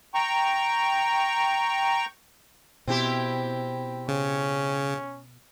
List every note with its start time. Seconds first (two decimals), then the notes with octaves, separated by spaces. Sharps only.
0.14 G5 A#5 C#6
2.87 B2 C4 E4 G4
4.08 C#3 C#4